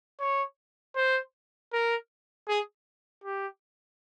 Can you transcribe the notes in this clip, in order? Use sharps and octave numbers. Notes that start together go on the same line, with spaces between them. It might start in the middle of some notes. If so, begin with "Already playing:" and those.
C#5
C5
A#4
G#4
G4